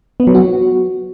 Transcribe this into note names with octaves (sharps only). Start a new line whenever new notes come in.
B3
F#3
F#4